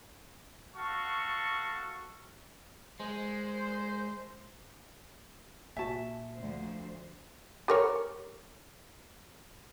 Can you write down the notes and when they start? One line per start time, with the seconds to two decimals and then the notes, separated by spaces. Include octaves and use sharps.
0.76 F#4 A4 F5 A5 C#6
3.00 G#3 C5
5.77 A#2 F#4 E5 G#5 A5
6.38 D2 F3 C5
7.68 G4 A#4 C#5